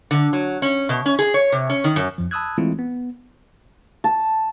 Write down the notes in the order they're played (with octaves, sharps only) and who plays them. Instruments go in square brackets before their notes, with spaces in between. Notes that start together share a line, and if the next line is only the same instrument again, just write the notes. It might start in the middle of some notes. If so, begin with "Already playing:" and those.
[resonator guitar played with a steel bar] D3
F#3
C#4
B2
C#4
G#4
C#5
C3
C#4
D#3
F#2
[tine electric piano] F2 F3
A5 B5 D#6 E6 F#6 G#6
E3 G#3 A3 C4 E4 F4
B3
[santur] A5